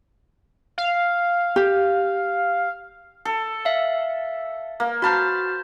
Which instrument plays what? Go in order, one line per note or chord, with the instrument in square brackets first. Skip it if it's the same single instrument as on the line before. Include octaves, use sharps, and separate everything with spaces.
[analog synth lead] F5
[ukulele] G4
[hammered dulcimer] A4
[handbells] E5 F5
[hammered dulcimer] A#3
[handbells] F#4 F6 [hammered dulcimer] C5 A5 B5